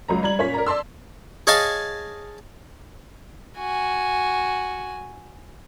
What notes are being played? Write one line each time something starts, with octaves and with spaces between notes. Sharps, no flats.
C#2 F#3 A#5
G3 A#5 G#6 F#7
A#2 C#4 C#5 B6
A#4 D5 A#5
D5 A5 C6 E6
G#4 C#5 D#5 F5 G#5 A5
F#4 G#5